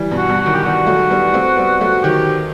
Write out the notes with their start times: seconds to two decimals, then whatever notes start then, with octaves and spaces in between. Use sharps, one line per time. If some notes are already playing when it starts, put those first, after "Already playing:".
Already playing: E3 G3
0.11 G2 B2
0.17 F#4
0.29 G2 B2
0.41 F#4
0.46 D#3 F#3
0.55 G4
0.63 E3 G3 F#4
0.87 F#3 A3
1.11 G3 B3
1.34 A3 C4
1.57 G3 B3
1.80 F#3 A3
2.04 D#3 F#3 G4